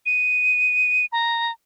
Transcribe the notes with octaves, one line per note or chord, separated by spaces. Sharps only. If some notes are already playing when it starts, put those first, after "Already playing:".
D#7
A#5